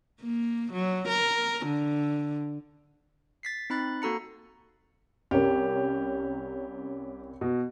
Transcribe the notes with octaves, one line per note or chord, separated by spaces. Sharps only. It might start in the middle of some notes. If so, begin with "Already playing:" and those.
A#3
F#3
A#4
D3
A6 B6 C7
C4 D#4 B5 F#6 A6
A#3 F#4 A4 A#5 C#7
C2 C#4 G4 A#4
B2